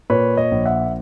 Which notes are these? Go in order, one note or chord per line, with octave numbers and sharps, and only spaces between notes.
A#2 B4 C#5
C#5 D#5
A#1
E5 F#5